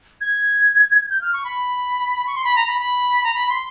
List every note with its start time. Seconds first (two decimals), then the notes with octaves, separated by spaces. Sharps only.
0.21 G#6
1.10 G6
1.21 F6
1.33 C#6
1.44 B5
2.27 C#6
2.36 C6
2.44 B5
2.56 A#5
2.67 B5
2.79 B5
3.24 A#5
3.34 B5
3.50 C6